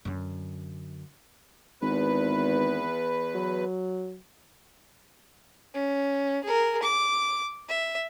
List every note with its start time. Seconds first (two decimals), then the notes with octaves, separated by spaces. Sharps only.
0.05 F#2 D3
1.82 G#1 E2 B4
3.35 F#3
5.74 C#4
6.44 G#4 A#4
6.83 D6
7.69 E5